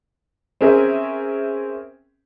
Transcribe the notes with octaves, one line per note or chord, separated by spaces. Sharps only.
C4 C#4 G#4 A#4 E5